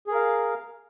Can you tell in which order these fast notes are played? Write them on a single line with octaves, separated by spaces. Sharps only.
G#4 A#4 F5